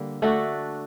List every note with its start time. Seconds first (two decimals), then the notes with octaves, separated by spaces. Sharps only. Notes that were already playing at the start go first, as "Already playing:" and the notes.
Already playing: D3 G3 A#3
0.22 A3 D4 F#4 A4